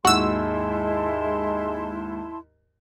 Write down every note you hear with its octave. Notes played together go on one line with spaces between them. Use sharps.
D#2 G#2 G#3 E4 F#4 A5 C6 E6